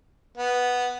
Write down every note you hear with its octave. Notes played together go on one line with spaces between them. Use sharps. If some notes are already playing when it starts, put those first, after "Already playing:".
B3